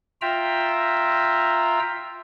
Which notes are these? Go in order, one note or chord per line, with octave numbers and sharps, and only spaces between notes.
F4 E5 G5 A#5 E6